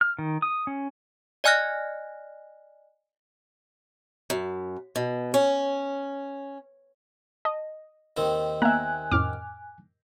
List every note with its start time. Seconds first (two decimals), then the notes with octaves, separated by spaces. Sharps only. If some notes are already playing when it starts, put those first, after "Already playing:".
0.01 F6
0.19 D#3
0.42 D#6
0.67 C#4
1.44 D5 D#5 G#5 F6 F#6 A#6
4.30 F#2
4.96 B2
5.34 C#4
7.45 D#5 A5
8.17 D#2 D#3 C4
8.62 A#3 B3 E5 G#5 A#5 F#6
9.11 F2 A2 C#4 D6 F6